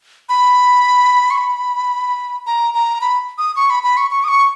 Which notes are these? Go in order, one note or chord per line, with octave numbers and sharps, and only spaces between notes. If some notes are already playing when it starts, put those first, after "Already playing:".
B5
C#6
B5
A#5
A#5
B5
D#6
C#6
B5
B5
C#6
C#6
D#6
C#6